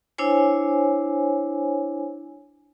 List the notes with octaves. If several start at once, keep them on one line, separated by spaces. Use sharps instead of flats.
D4 E4 C5 C#5 G#5